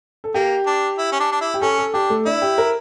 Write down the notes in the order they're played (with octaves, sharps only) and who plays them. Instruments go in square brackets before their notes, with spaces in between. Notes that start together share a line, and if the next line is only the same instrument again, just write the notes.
[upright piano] A4
[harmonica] A#3 [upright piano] G4
[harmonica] D4
E4
C#4
D4
D4
E4
[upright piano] G4
[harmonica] C#4 [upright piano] A4
[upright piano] A4
[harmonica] D4 [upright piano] G4
[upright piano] A3
[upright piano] D4 [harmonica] E4
[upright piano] G4
A#4